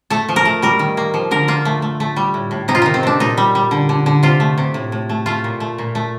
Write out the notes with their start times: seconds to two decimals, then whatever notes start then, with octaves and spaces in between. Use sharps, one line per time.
0.10 A3 A4
0.29 F3
0.36 A#4
0.45 A3
0.62 G3 A#4
0.79 D#3
0.97 A#3
1.14 F3
1.31 D3 A#4
1.48 A#3 F4
1.65 A3
1.82 A3
2.00 A3
2.16 G3
2.34 A2
2.51 A2
2.68 C3 D#4
2.75 F4
2.82 D#3 D#4
2.94 C4
3.03 C3 D4
3.20 A#2 D#4
3.37 G3
3.55 G3
3.71 D3
3.89 D3
4.06 D3
4.23 C3 F4
4.40 A3
4.58 C3
4.74 A2
4.92 A2
5.09 A3
5.26 A3 F4
5.44 A#2
5.60 A3
5.78 A#2
5.95 A3